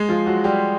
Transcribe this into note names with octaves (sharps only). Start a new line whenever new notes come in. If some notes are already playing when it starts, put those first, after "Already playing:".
Already playing: G#3 G#4
F3 F4
F#3 F#4
G3 G4